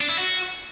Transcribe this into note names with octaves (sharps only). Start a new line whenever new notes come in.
D4
E4
F#4